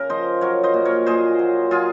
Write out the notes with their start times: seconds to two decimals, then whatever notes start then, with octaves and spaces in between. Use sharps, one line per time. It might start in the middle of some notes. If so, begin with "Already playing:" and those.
Already playing: C#3 A#4
0.10 F3 C5 D#5
0.41 F#3 A#4 C#5
0.63 C5 D#5
0.74 A#2
0.85 A#4 C#5
1.06 A#2 G#4 C5
1.39 F#3
1.71 F#3 F4 G#4